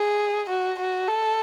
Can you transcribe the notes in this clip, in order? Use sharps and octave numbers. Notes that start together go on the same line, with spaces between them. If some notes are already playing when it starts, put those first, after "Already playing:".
Already playing: G#4
F#4
F#4
A4